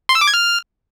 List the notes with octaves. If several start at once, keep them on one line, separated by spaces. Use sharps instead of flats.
C6
E6
D6
G#6
F6